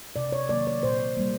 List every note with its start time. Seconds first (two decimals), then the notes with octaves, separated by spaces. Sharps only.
0.16 C3 D5
0.32 C#5
0.49 D#3 F#3 A#3 D5
0.67 C#5
0.83 A#2 C5
1.17 G3 A#3